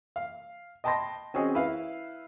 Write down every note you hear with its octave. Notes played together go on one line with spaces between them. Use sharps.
F5
D#5 G5 A5 B5 C6 A#6
C4 C#4 F#4 G#4 D#5
E4 B4 E5 F5